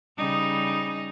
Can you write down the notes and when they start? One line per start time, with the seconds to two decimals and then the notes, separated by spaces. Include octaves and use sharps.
0.18 C#3 G3 D#4